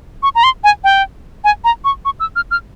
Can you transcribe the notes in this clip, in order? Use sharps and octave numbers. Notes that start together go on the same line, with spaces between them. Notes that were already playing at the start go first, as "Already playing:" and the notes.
C#6
A#5
C6
G#5
G5
G#5
A#5
C#6
C#6
E6
F6
F6